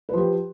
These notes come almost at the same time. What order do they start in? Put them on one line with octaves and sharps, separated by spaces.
B4 F3 G4